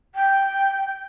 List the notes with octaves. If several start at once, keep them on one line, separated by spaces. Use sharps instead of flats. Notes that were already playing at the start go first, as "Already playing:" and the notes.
G5